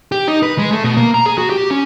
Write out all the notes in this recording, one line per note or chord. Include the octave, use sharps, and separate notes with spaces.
G4
D#4
B4
G#3
A3
B2
A#3
A#5
G#4
F#4
G4
C#4